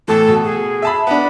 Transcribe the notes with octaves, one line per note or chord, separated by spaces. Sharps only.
A2 E3 A4
B2
G#4
E5 A5 B5
B3 D4 B5